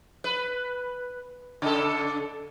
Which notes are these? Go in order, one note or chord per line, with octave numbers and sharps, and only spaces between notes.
B4
C#3 A4